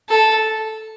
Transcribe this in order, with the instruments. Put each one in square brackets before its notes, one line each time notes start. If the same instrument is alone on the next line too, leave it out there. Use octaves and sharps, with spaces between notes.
[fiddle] A4